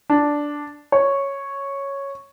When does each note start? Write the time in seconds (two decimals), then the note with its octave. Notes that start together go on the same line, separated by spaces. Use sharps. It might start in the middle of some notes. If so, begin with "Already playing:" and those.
0.10 D4
0.92 C#5